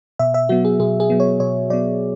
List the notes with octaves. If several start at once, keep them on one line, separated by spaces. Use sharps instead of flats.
B2 E5
E5
F#3 B3 F#4
G#4
B2 G#4
G#4
F#3 B3
C#5
B2 C#5
F#3 B3 D5